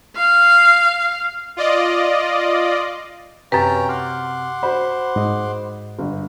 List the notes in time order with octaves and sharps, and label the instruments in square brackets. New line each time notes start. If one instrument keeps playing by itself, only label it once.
[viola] F5
[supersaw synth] F4 D5 D#5
[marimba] F#2 B4 [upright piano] C3 [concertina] C#4 G5 A#5
[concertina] F#5 C6 D6 [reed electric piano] F6
[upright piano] F#4 C5 B5
[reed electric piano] G#2 D#5
[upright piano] G1